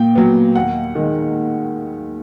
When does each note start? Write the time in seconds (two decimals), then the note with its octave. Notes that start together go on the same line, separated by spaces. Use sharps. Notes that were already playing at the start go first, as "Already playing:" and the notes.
Already playing: A#2 G5
0.15 F#3 B3
0.55 D#2 F#5
0.95 D#3 G#3